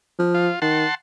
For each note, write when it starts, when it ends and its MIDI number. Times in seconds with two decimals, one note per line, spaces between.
0.19 0.50 53
0.34 0.60 65
0.62 0.85 51
0.62 0.95 78
0.62 0.95 81
0.62 0.95 84